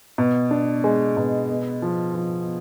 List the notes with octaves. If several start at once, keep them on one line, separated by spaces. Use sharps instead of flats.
B2
D4
G#3
B2
B3
F3
F3